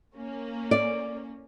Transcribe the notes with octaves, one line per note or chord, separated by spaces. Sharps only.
A#3 C#4
D5